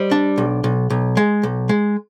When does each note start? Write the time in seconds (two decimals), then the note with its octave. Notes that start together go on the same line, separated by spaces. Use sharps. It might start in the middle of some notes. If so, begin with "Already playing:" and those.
Already playing: G3 C5 D#5
0.11 D4
0.38 B1
0.64 B1
0.90 B1
1.17 G#3
1.43 B1
1.69 G#3